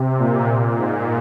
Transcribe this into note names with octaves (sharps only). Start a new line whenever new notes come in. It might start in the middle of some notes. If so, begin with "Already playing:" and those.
Already playing: C3
A#2
G#2